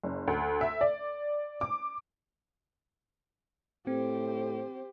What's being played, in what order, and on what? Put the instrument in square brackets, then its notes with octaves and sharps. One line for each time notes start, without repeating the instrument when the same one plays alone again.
[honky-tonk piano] F#1
D2
E5
D5
D6
[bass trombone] A2 [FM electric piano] C4 [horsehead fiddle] G4 C5